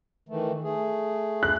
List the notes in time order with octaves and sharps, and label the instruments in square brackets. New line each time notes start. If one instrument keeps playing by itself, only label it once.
[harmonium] D#3 E3 A3
A3 G#4
[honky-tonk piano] F#6